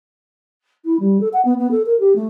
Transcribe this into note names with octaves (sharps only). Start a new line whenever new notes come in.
E4
G3
A4
F#5
B3
B3
A4
A#4
G4
A3